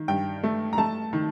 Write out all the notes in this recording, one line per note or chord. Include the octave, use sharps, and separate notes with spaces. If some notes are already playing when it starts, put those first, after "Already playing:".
Already playing: D#3
G2 G5
A3
A#5
A3 A5
D#3